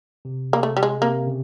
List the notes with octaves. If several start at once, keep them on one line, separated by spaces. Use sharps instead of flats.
C3
A#3
A3
G3
G#3
C3 A#3
C#3